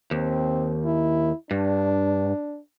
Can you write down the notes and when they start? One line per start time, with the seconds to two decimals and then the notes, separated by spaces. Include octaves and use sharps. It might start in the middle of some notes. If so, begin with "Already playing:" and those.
0.11 D#2 C4
0.85 E4
1.51 G2 D4